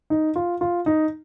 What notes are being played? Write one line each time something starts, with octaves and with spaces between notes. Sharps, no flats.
D#4
F4
F4
D#4